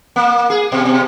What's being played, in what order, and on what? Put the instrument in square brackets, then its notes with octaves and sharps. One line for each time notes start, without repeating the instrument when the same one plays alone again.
[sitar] A#3
G#4
B2
B2